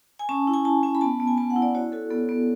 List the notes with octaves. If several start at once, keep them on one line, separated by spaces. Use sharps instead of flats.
G#5
C#4 A5
E4
G#5
E4 A5
C#4 G#5
B5
B3 A5
B3
G#5
B3 A5
F#5
E4
D5
F#4 C#5
F#4 A4
B3 A4
B3